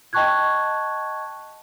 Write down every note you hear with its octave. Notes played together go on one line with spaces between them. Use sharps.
D#5 G5 A5 C#6 F#6 G#6